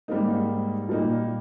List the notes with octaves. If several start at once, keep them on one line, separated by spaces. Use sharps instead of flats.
G#2 G3 A#3 D#4
A#2 G3 A#3 D#4